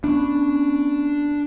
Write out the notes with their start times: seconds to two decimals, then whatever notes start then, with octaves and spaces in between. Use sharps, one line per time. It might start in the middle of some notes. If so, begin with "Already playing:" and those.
0.04 B3 C#4 D4